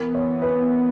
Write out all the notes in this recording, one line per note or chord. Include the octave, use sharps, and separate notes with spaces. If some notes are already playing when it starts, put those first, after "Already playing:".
Already playing: E3 B3 A#4
C#5
B4